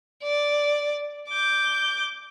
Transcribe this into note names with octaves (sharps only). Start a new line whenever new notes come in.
D5
D6 G6